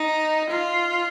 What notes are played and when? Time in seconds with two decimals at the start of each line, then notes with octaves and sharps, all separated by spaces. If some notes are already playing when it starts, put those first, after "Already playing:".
Already playing: D#4
0.50 F4